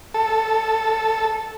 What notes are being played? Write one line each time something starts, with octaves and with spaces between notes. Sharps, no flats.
A4